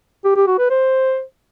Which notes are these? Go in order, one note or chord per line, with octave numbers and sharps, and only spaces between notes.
G4
G4
F#4
B4
C5